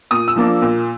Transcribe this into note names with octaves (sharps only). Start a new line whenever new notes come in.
A#2 D#6
E6
F3 A#3 D4
A#2